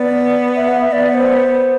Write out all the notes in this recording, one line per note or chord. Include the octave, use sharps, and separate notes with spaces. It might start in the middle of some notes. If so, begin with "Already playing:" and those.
Already playing: B3 D5
E5
F#5
E5
B3 D5
D5
C5